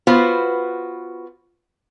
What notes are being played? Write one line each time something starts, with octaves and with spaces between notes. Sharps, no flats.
B3 F4 F#4 B4 C5